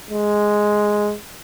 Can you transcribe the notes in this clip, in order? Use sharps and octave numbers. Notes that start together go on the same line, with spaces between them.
G#3